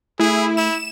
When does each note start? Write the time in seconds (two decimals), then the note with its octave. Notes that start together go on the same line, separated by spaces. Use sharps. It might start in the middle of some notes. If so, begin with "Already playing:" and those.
0.20 A3 E4 G#4
0.57 E4 E7